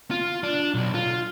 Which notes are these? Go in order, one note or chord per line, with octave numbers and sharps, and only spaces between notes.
F4
D4
B1
F4